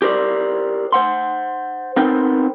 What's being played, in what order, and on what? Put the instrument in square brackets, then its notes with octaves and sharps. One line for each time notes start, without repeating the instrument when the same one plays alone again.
[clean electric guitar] G4 A#4 C5 D5
C5 F#5 C6
B3 C4 D#4 A#4 C5 G5